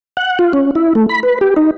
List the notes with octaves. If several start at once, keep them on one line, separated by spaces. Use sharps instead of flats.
F#5
F4
C#4
E4
A3
B5
B4
G4
D#4